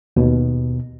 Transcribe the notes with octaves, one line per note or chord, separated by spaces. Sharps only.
D#2 B2